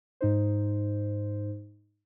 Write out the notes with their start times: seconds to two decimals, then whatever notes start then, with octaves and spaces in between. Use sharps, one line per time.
0.21 G#2 D#4 C5